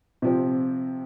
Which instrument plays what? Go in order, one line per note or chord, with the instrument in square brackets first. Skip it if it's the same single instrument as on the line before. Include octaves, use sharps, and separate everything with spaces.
[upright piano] C3 F3 C4